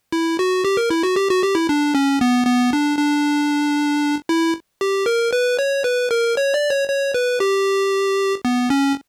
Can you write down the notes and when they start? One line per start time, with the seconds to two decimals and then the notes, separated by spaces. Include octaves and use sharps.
0.12 E4
0.39 F#4
0.65 G4
0.77 A#4
0.90 E4
1.03 F#4
1.16 G4
1.30 F#4
1.43 G4
1.55 E4
1.69 D4
1.95 C#4
2.21 B3
2.47 B3
2.73 D4
2.98 D4
4.29 E4
4.81 G4
5.06 A#4
5.33 B4
5.59 C#5
5.84 B4
6.11 A#4
6.37 C#5
6.54 D5
6.71 C#5
6.88 C#5
7.14 B4
7.40 G4
8.45 B3
8.70 C#4